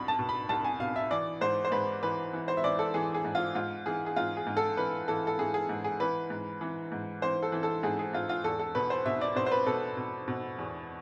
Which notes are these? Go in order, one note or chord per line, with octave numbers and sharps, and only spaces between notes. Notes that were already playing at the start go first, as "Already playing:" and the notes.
Already playing: C2 B2 B5
A5
B2
B5
C2 A5
G#5
B2 F5
E5
E3 D5
G#2 C5
C5
G#2 B4
E3 B4
E3
C5
E5
E3 D5
A4
E3 G#4
G#4
G#2
F4
G#2 F4
E3 G#4
G#4
G#2 F4
G#4
G#2
A4
E3 B4
E3 A4
A4
E3 G#4
G#4
G#2
G#4
E3 B4
G#2
E3
G#2
E3 C5
A4
E3
A4
G#2 G#4
G#4
G#2 F4
F4
E2 A4
A4
B2 B4
C5
B2 E5
D5
B2 C5
C5
B4
B2 A4
B2
B2
E2